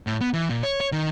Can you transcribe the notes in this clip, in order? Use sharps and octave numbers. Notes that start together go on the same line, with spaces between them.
A2
B3
E3
A#2
C#5
C#5
D#3